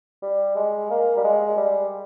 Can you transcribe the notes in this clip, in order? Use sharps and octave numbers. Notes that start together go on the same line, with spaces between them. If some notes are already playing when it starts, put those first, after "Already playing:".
G3
G#3
A#3
G3
G#3
G3